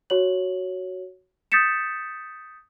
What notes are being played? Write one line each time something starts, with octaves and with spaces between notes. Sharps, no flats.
F#4 C#5 F#7
D#6 G6 A6 B6 C#7 E7